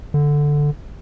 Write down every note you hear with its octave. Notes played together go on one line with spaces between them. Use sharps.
D3